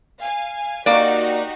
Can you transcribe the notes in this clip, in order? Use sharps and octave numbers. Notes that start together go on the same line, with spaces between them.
F5 G#5
A#3 D#4 F#4 G4 D5